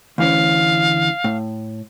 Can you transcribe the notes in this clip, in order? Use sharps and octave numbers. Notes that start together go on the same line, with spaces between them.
D2 E3 C#4 F5
A2